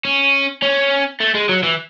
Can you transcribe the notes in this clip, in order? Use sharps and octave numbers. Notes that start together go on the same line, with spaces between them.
C#4
C#4
A3
G#3
F#3
E3